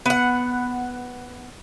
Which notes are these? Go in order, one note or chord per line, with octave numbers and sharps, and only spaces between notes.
B3 F#5